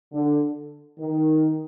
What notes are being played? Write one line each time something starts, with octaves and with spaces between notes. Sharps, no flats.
D3
D#3